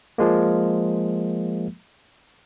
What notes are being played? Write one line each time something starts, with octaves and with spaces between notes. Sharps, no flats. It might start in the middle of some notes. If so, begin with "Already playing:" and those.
F3 G#3 A#3